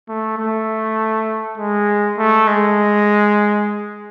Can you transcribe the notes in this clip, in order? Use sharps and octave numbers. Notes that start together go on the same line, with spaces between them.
A3
A3
G#3
A3
G#3